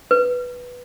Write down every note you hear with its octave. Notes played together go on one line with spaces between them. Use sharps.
B4